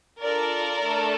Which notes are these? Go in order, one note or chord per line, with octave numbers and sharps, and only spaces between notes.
D4 F4 A4 A#4 D5
A3 D4 A4